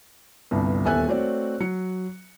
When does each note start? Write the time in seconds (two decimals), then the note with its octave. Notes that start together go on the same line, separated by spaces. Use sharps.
0.51 G1 C2 G2
0.85 D#1 E2 A4 E5 G#5 F#6
1.08 A3 C4 F#4 C#5 D5
1.60 F#3 C#7